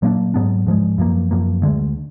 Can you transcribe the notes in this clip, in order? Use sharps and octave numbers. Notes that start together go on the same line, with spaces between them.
A#2 F#3 A#3 D4
G#2 F#3 B3 D4
G#2 F3 G#3
F#2 F3 A#3
F#2 F3 A#3
D2 D3 G#3